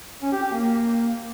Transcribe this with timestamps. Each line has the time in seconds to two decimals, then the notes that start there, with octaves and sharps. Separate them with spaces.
0.22 C#4
0.32 G4
0.42 G4
0.52 A#3